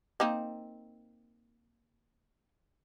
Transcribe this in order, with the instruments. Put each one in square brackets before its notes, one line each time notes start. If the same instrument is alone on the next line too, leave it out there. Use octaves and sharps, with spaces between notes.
[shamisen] A#3 C4 D#4